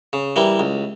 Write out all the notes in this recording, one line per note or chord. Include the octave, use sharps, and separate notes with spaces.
C#3
E3 G3 A#3
C#2